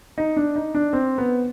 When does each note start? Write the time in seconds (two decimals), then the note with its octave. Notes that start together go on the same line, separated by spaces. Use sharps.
0.18 D#4
0.36 D4
0.56 D#4
0.75 D4
0.93 C4
1.18 B3